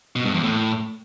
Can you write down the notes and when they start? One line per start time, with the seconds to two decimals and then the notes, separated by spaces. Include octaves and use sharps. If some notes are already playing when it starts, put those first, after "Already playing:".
0.16 B2
0.25 G2
0.34 E2
0.43 A2